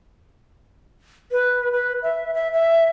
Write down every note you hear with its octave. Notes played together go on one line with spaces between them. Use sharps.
B4
B4
E5
E5
E5